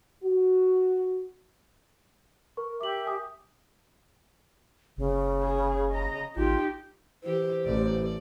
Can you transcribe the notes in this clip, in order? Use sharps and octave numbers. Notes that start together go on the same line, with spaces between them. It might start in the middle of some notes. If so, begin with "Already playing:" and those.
F#4
A#4 C#6
G4 E5 D6 F#7
G#5 D#6
F#1 C#3
G#4
D#5 A#5
A1 D#4 F4 G4
E3 G4 C5
A1 D5